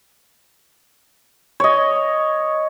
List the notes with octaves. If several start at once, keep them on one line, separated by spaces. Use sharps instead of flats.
C#5 D#5